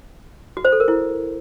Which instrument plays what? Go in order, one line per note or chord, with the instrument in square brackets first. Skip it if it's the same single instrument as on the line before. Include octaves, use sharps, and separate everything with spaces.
[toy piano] F#4
C5
A4
A#4
E4